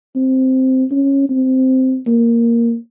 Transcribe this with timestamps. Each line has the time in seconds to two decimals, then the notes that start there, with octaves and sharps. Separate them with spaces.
0.16 C4
0.91 C#4
1.30 C4
2.07 A#3